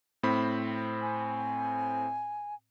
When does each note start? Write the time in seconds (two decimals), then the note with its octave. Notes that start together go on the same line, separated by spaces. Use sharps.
0.23 A2 C4 B5
1.01 G#5